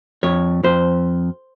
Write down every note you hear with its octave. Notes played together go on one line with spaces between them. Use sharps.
F2 C#5
F2 C5